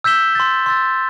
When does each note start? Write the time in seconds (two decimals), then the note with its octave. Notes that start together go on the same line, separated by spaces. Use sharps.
0.04 E6 G6 B6 E7 G7
0.35 C6 E6 A6
0.66 C6 E6 A6